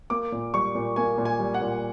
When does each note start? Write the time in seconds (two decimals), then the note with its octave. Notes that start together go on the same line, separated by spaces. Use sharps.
0.10 A#3 D6
0.32 A#2
0.54 G3 C#6
0.75 A#2
0.96 A#3 G#5
1.18 A#2
1.25 G#5
1.39 G3
1.54 F#5
1.61 A#2